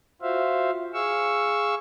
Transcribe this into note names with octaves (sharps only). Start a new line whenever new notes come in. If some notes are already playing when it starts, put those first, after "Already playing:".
F4 F#4 C5 E5 F5
G#4 F5 C#6 E6